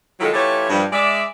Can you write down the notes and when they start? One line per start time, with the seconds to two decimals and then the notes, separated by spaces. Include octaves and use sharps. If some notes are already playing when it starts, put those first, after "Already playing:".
0.20 D#3 F#3 G#3 E4 F4 A4
0.34 E3 A3 F4 G4 C#5
0.70 G2 F3
0.92 G#3 D5 E5